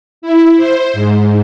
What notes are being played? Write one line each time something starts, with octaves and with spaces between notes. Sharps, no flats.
E4
C5
G#2